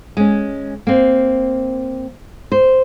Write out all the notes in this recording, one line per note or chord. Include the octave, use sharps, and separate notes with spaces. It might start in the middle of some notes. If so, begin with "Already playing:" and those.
G#3 C#4
A#3 C4
C5